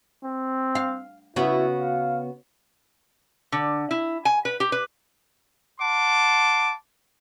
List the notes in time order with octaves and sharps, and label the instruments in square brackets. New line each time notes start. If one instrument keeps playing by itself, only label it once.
[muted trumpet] C4
[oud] F5
[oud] C#3 B3 F#4 [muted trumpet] E4
[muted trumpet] F5
[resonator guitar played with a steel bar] D3
E4
G#5
B4
G4
B4
[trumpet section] F#5 A5 C6 D6